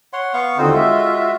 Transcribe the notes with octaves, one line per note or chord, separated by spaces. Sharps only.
C#5 F#5 C6
B3 F5 C#6
D#2 D3 C4 D#4 F4 F#4 C5
G#3 F#4 E5